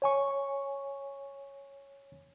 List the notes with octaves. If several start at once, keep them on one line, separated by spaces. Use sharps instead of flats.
C#5 G#5 C#6